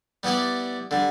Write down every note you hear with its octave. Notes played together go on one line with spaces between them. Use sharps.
G3 B3 E4 G4 D5
D3 G3